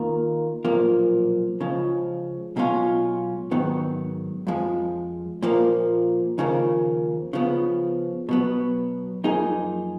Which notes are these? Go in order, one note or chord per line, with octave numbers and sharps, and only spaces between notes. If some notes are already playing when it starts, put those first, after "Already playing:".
Already playing: D#3 A#3 F4 A#4
B1 A#2 F3 A#3
C#2 C#3 F3
B1 B2 G#3 C#4 F4
G#2 D#3 F#3 B3
F2 F3 G#3
A#2 F3 A#3
D#2 C#3 F3 A#3
C#3 F3 B3
B2 F#3 B3
F#2 F3 A#3 D#4 G#4